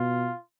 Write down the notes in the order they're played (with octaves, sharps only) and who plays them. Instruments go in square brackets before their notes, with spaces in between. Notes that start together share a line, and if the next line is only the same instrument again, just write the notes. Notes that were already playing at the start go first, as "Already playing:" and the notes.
Already playing: [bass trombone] B2 [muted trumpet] F4